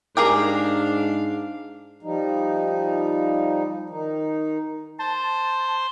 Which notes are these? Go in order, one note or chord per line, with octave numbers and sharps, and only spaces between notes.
G#2 D4 G4 G#4 A#4 F5 G5 D6
F3 G3 D#4
D#3 D#4
C5 A5